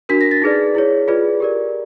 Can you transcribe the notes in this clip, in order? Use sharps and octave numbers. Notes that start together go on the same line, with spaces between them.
D4 F#4 A#4 B6
A#6
A6
D#4 G#4 B4 D5
E4 G#4 C#5
F4 G#4 B4 D5
G4 A#4 D5